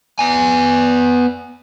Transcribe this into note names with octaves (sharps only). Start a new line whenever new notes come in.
B3 G#5